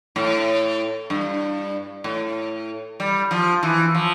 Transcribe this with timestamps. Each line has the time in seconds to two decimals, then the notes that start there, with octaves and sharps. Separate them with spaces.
0.16 A2
1.10 G2
2.04 A2
3.00 G3
3.31 F3
3.63 E3
3.95 F3